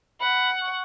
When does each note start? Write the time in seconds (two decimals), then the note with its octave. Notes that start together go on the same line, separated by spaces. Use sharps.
0.20 F#5 B5
0.61 C#6